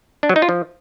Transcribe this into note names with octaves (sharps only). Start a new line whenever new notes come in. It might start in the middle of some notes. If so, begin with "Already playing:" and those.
D4
F#3
D#4
F4
F3